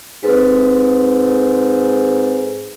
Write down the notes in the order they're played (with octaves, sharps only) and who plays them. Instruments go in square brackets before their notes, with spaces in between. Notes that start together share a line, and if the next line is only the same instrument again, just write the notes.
[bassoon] G#2 [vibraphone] C4 A4 B4